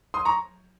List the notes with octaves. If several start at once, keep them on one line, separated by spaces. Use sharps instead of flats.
C6 D#6
A#5 C#6